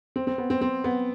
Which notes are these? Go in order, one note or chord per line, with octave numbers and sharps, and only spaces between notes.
C4
C4
B3
C4
C4
B3